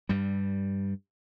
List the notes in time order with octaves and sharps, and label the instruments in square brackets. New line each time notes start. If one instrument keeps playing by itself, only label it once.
[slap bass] G2 G3